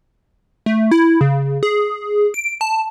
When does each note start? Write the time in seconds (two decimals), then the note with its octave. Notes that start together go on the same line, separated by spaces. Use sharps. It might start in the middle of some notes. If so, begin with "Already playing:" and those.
0.66 A3
0.91 E4
1.21 C#3
1.63 G#4
2.34 D7
2.61 A5